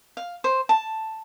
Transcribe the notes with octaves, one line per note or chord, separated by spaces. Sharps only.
F5
C5
A5